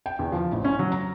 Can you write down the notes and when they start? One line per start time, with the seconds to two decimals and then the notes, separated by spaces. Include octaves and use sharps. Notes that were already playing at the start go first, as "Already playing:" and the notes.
0.06 G5
0.19 E2
0.32 F3
0.52 A1
0.64 C#4
0.79 F#3
0.92 A#5